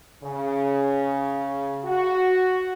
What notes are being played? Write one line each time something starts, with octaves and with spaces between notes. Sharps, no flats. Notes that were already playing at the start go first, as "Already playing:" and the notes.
C#3
F#4